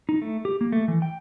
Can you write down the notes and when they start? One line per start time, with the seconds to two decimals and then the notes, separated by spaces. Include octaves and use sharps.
0.09 D#4
0.22 A3
0.45 G4
0.61 A#3
0.72 A3
0.88 E3
1.02 G5